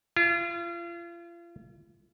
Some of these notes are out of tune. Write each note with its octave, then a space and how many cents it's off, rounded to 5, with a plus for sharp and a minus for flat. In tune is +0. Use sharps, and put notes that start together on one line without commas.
F4 -35